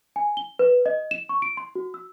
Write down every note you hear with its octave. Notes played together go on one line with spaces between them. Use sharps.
G#5
G7
B4
D#5
E7
C#6
D7
C6
F#4
E6